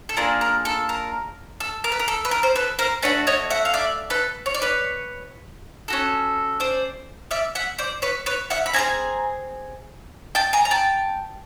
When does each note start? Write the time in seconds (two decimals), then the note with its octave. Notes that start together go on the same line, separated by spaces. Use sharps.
0.09 A4
0.17 A#3 D4 F4 G#4 A#4
0.41 A#4
0.65 A4
0.89 A#4
1.60 A4
1.84 A#4
1.92 B4
2.00 A#4
2.08 A4
2.25 B4
2.31 A#4
2.43 C5
2.56 A4 B4
2.79 A#4 C5
3.03 A3 D4 F#4 B4 C#5
3.27 C#5 D#5
3.50 E5 F#5
3.65 F5
3.74 D5 E5
4.10 A4 B4
4.46 C#5
4.54 D5
4.62 B4 C#5
5.88 C#4 F#4 A4
6.60 C5 D5
7.31 D5 E5
7.55 E5 F#5
7.79 C5 D5
8.02 B4 C#5
8.26 B4 C#5
8.50 E5 F#5
8.66 B5
8.73 C4 F4 G#4 G#5 A#5
10.35 G5 A5
10.53 G#5 A#5
10.65 A#5
10.71 G5 A5